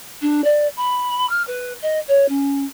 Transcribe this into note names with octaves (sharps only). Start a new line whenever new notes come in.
D4
D5
B5
F6
B4
D#5
C#5
C#4